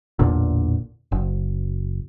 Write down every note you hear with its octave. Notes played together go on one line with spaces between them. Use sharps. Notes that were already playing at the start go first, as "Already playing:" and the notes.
A1 E2 A#2 D3
F#1